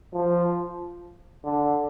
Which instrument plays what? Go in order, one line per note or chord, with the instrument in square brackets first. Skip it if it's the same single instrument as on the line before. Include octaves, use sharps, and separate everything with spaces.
[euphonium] F3
D3